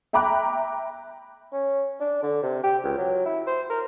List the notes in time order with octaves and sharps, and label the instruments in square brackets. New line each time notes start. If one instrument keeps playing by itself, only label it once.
[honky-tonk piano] E5 G5 A#5 B5 D6 F#6
[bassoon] C#4
D4
D3
C3
G4
C#2
F#3
E4
C5
A#4